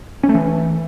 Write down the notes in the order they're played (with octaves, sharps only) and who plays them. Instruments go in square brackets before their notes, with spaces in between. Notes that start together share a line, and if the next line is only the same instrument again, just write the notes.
[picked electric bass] C#4
A3
E3